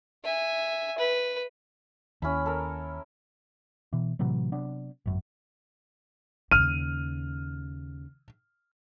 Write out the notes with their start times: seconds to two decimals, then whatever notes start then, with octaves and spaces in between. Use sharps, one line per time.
0.24 E5 G#5
0.98 B4
2.22 D#2 C#4 E4 B5
2.46 A4 A#4
3.93 B2 E3
4.19 A2 C3 E3 F#3
4.52 C3 F#3 B3 D4
5.06 G#1 F#2
6.51 D#2 C#3 F6 D#7